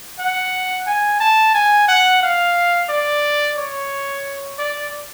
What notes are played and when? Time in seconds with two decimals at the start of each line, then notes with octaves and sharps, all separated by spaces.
0.19 F#5
0.87 G#5
1.20 A5
1.55 G#5
1.88 F#5
2.23 F5
2.89 D5
3.57 C#5
4.59 D5